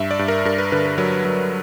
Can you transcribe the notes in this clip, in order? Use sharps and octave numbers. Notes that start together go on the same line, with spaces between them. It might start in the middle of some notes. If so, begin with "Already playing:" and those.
Already playing: G2 E5
D5
G2
A#4
G2 A#4
B4
D3 B4
A#4
F#3 A#4
F#3